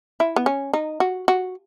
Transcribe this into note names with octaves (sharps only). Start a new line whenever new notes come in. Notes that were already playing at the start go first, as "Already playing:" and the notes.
E4
B3
C#4
D#4
F#4
F#4